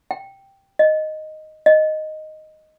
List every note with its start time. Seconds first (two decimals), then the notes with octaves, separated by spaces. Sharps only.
0.11 G5
0.79 D#5
1.66 D#5